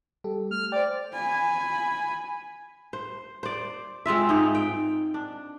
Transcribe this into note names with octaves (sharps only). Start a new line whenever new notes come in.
G3 G4 A4
A3 F6
C5 D5 G5
G#5 B5
C5
C5 D5
G#3 C4 F4 E5
G#2 D#4 G#4
G5
D4